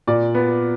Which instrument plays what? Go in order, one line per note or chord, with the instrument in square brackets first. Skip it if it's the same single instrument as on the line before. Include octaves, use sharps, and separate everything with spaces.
[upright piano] A#2 D5
B3